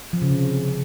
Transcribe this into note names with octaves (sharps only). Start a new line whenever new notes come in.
F3
C#3
C3